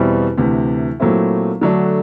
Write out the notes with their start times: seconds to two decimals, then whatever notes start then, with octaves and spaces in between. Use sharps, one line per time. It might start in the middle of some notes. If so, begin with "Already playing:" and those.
Already playing: E2 B2 G3 C4 E4
0.38 D2 C3 E3
1.00 A#2 F#3 A3 C4 E4
1.61 D3 F#3 A3 D4